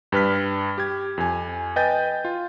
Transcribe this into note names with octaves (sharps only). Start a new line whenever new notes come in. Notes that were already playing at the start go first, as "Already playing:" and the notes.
G2 B4 F6 B6
G4 G#6
F2 G#5
B4 D#5 G5 G#5 G6 A6
F4